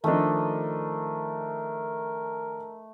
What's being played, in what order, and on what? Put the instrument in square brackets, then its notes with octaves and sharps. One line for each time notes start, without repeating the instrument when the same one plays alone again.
[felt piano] D#3 F3 D4 [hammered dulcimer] A3 D#5 [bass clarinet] A#4